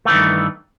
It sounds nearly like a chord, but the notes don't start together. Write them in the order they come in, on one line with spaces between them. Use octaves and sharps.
A3 E3 D#3 G2